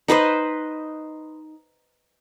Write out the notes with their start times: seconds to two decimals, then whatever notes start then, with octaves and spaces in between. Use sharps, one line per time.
0.08 D#4 B4 C5 D#5